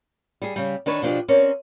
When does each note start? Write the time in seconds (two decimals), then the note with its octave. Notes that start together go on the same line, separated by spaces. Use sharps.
0.42 G3 G#4
0.56 C#3 G3
0.86 D#3 D4 B4 C#5
1.02 B2 F3 D4 G4
1.28 C4 C#4 A#4 C#5 D5